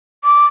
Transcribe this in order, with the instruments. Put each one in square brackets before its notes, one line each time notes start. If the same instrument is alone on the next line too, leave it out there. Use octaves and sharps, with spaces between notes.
[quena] D6